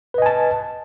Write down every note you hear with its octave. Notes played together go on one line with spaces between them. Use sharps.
B4 D#5 G#5 A5